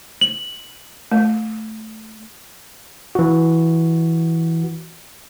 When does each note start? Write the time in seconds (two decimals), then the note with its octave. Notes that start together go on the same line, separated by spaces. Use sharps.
0.21 F#7
1.11 A3
3.15 E3 F#4